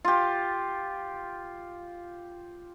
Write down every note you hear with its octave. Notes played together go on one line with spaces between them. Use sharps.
F4 G4